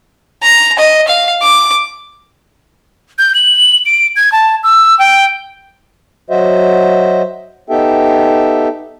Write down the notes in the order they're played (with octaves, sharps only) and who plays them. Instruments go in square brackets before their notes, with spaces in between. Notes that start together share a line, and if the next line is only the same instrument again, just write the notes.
[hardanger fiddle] A#5
D#5
F5
D6
[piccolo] G6
F#7
D7
G#6
A5
E6
G5
[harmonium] F#3 F#4 C5 D#5 E5
B3 D#4 G4 A4 E5 G5